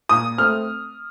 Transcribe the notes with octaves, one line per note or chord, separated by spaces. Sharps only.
A#2 D#6
A3 C4 F6